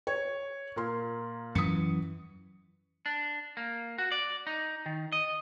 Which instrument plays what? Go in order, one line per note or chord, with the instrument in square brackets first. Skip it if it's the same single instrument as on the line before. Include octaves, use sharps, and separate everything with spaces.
[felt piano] C#5
A#2 A#4 C6
[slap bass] F#2 E3 [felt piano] D#6 C#7
[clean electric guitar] D4
A#3
F#4
D5
D#4
D#3
D#5